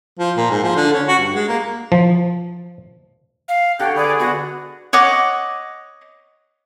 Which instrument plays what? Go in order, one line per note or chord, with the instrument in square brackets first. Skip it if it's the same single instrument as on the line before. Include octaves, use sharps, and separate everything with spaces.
[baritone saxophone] F3
A#2
G#2
F3
D3
C#4
F#4
G2
G#3
A#3
[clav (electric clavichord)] F3
[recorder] F5
[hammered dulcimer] D3 C#5 [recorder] G4 [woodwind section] F#5 G5
[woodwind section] D3 G#4 [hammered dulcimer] B4 [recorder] D5
[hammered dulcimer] B3 F#5 [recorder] F#4
[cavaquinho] C#5 D#5 F#5 D6